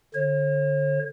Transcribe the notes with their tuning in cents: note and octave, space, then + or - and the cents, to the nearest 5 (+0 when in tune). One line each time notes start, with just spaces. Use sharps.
D3 +0 C#5 -45